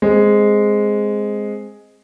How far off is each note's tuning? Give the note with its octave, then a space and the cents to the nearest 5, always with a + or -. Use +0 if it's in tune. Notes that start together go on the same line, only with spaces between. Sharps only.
G#3 +0 C4 +0